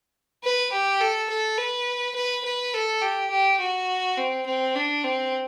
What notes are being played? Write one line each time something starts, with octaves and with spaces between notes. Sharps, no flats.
B4
G4
A4
A4
B4
B4
B4
A4
G4
G4
F#4
C4
C4
D4
C4